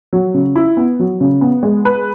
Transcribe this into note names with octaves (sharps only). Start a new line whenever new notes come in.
F#3
C#3
E4
B3
F#3
C#3
B3
G#3
B4